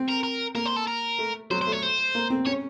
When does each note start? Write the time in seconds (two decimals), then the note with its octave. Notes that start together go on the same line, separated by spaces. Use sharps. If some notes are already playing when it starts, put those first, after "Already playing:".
Already playing: C4
0.08 A#4
0.23 A#4
0.55 A#3 A#4
0.66 C5
0.77 A4
0.88 A#4
1.19 A3
1.50 F#3 C5
1.62 C5
1.67 A3
1.72 C#5
1.83 C5
2.15 A#3
2.30 C4
2.46 C#4 C#5